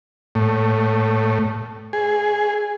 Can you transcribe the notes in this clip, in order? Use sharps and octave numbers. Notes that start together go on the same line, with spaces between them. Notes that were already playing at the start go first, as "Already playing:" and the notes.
A2
G#4